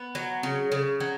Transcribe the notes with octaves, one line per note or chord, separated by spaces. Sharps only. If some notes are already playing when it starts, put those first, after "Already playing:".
Already playing: B3
F#3
C#3
C#3
F#3